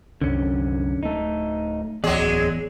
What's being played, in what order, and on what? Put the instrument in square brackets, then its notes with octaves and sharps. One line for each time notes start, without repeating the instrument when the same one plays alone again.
[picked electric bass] C2 F#2 [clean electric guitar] D3 C#4
[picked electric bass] D1 A3 [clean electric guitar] D#4
[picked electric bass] D1 A1 [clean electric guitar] E2 D5 [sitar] F#3 G#3 G#4